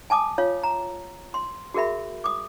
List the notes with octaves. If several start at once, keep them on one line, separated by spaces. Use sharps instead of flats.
G#5 A5 D6 D#6
F4 C#5 F5
A#5
C6
F#4 G#4 A#4 E5 B5
D6 D#6